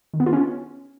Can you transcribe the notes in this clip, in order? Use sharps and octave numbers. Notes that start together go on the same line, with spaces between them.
D#3
B3
F4
C#4